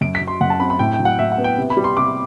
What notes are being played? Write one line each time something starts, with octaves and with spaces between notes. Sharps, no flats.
F#2 D7
B6
F#3
C6
F#2 F#5
A5
C4 B5
B5
A2 G5
G5
F#3
F#5
A2 E5
F#5
B3
G5
C3
B5
G3
C6
C3 D6